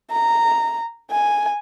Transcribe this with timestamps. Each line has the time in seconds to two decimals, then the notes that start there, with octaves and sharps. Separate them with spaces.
0.11 A#5
1.11 G#5